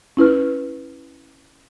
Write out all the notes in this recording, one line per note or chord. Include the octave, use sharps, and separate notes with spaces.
C#4 E4 B4 F6